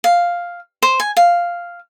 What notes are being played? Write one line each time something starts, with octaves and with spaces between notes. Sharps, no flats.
F5
C5
G#5
F5